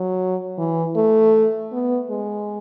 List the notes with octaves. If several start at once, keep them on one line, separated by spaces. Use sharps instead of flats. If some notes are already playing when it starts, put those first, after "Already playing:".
Already playing: F#3
E3
A3
B3
G#3